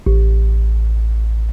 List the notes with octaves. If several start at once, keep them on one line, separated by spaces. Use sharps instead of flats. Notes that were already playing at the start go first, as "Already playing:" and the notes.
A1